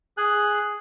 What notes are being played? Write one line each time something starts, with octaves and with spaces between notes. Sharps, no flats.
G#4 G#5 F#6